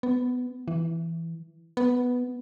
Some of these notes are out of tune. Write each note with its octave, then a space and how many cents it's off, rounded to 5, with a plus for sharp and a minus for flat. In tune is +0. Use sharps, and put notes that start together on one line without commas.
B3 +15
E3 +5
B3 +0